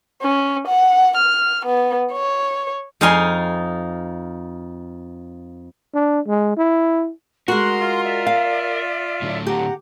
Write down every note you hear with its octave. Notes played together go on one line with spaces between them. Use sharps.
C#4
F#5
F6
B3
C#5
F2 D#4 F4 F5 G#5 C6
D4
G#3
E4
G#3 F#4 A#4 F#5 C6 F6
F4
D5 E5
F5
A2 D3 F#3
G4 F#5 A#5